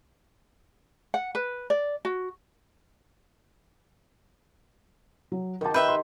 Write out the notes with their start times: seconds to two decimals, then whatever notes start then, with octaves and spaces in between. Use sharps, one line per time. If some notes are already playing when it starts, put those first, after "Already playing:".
1.14 F#5
1.35 B4
1.70 D5
2.05 F#4
5.32 F#3
5.61 D#3 G4 A#4 A5
5.74 B4 E5 G5 G6
5.88 C6